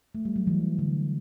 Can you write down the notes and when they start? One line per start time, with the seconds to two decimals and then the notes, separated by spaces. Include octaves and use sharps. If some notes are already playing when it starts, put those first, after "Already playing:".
0.15 A3
0.25 G3
0.36 F#3
0.47 E3
0.79 D3